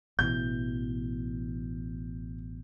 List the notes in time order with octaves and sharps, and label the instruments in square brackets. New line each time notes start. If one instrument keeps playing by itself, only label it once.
[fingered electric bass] A1 B2 E3 [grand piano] G6